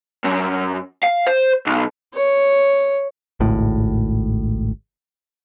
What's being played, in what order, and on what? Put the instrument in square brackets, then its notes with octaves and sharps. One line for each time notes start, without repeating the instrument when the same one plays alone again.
[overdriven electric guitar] F#2
F5
C5
B1
[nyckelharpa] C#5
[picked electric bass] G#1 C#2 A2